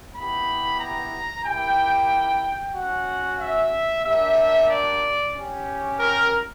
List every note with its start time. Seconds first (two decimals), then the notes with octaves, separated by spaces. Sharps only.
0.14 B3 E4 G4 B5
0.80 A#5
1.45 A#3 E4 G4 G5
2.75 C#4 F#4 F#5
3.40 E5
4.04 A#3 D4 G4 E5
4.70 D5
5.35 C#4 G4
6.00 A#4